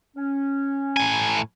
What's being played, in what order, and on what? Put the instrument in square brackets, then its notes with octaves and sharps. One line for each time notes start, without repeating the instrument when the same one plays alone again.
[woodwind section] C#4
[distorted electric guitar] A2 G#5